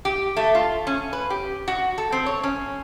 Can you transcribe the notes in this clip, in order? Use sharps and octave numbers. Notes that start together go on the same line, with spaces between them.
G4
A3
F4
C#4
B4
G4
F#4
A4
C4
C#5
C#4